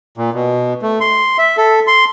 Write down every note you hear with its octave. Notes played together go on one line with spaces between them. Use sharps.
A#2
B2
A3
C6
E5
A4
C6